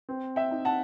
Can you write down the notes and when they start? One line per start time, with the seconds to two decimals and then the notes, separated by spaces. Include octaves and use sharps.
0.09 C4
0.36 E5 G5
0.51 D#4
0.65 F#5 A5